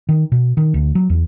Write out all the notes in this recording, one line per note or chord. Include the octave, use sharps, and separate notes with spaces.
D#3
B2
D#3
D2
F#3
E2